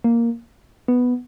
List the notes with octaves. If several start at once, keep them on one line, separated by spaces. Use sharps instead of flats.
A#3
B3